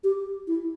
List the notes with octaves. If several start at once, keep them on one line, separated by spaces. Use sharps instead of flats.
G4
E4